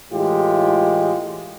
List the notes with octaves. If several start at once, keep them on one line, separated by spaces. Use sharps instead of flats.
A2 E3 G#3 F4 G4